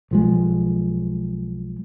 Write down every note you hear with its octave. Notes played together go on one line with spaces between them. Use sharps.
B1 F3 G#3